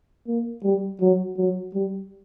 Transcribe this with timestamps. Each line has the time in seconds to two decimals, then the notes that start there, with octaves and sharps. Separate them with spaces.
0.28 A#3
0.64 G3
1.01 F#3
1.37 F#3
1.74 G3